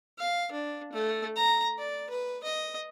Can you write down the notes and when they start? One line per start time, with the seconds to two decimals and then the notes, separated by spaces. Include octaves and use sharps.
0.18 F5
0.52 D4
0.93 A3
1.36 A#5
1.78 D5
2.10 B4
2.44 D#5